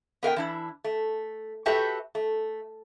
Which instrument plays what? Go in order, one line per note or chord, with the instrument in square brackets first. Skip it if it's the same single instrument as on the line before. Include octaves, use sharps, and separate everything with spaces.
[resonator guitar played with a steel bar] B3 A#4 F5 G5
E3 D4 E4
A3
F#4 G4 A4 B4 E5
A3